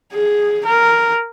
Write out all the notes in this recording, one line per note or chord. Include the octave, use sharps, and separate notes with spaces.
G#4
A#4